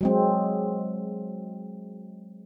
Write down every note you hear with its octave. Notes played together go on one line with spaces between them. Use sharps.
F#3 G#3 C4